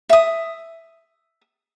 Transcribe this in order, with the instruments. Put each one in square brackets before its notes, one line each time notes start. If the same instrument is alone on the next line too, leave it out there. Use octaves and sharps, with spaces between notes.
[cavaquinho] E5 D#6